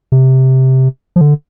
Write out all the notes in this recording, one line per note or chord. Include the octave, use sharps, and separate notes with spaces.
C3
F3
D3